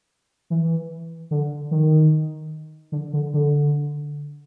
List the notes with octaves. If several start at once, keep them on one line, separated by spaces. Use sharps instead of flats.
E3
D3
D#3
D3
D3
D3